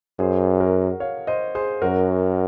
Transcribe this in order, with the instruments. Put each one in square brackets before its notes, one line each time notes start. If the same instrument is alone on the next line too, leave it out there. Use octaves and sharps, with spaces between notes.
[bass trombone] F#2 [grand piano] G#4 C5
[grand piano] F#4 A#4
C#5 F5
C5 D#5
G#4 C5
[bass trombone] F#2 [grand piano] F#4 A#4